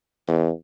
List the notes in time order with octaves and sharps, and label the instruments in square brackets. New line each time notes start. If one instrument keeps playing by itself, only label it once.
[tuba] E2